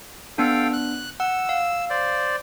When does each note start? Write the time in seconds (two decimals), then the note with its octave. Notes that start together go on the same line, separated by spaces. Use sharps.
0.38 B3 D4 A4 F5 G5
0.73 F#6
1.20 F#5 E6
1.49 F5
1.90 C5 D5